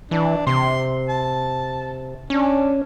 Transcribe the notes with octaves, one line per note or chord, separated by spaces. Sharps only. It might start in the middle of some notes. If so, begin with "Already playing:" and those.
E3 D4
C3 C6
A5
C#4 D4